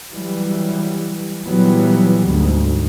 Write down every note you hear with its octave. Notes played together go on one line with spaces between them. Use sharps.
E3 F#3 G3
A#2 E3 F#3 G3 B3
D2 G#2